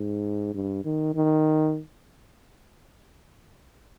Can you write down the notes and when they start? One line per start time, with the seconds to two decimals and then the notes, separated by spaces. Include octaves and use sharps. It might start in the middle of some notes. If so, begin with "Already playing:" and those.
Already playing: G#2
0.54 G2
0.85 D#3
1.15 D#3